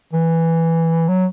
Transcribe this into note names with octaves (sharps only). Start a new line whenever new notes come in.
E3
F#3